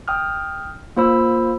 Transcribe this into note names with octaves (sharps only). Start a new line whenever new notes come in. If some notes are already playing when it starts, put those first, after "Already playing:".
G5 D#6 F6
A#3 F4 C5 B5 E6